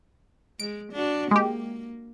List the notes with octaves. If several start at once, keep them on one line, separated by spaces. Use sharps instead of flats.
G#3 D7
D4 F#4
G#3 A#3 G4